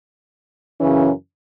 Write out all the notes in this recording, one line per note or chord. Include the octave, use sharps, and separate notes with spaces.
F#2 C#3 E3 C#4